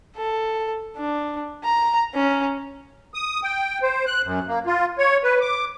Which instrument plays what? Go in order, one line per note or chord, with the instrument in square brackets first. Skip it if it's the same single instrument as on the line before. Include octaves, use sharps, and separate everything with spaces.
[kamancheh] A4
D4
A#5
C#4 A#5
[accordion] D#6
G5
C5
F#6
F#2
A#3
F4
C#5
B4
D6